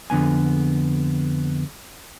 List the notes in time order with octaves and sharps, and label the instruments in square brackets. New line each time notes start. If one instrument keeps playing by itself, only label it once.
[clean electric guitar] F2 D3 B3 G#5